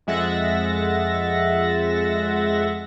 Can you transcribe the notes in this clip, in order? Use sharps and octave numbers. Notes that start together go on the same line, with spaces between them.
F2 G#3 E5 F#5 A6 A#6